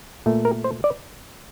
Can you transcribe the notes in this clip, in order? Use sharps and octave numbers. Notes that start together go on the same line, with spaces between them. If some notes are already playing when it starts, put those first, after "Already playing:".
A#2 A3
A#4
C5
D5